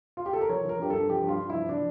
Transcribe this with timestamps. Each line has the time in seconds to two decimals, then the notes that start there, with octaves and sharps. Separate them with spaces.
0.17 F4
0.26 G4
0.33 A4
0.41 A#4
0.49 F3 C#5
0.65 F3 A#4
0.79 G2 G4
0.90 G2 A4
1.09 F3 G4
1.24 G2 F4
1.39 G2
1.50 F3 E4
1.69 F3 D4